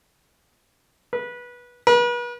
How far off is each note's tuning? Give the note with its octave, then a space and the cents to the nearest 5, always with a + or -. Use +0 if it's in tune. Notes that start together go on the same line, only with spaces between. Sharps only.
B4 -20
B4 -40